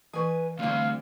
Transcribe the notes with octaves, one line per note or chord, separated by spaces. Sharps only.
E3 B4 G#5 C#6
D2 D3 G3 C4 F5